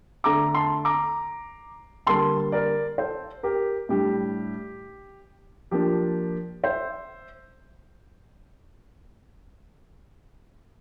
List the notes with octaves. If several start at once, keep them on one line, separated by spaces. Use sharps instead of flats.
D3 A3 D4 A#5 D6
A5 C6
A#5 D6
D3 G3 A#3 A5 C6
A#4 D5
A4 C5
G4 A#4
A2 G3 D4 G4
F3 A#3 D4 G4
C5 E5